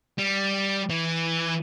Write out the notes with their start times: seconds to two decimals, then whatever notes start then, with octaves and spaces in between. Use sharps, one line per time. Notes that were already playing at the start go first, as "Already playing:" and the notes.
0.18 G3
0.90 E3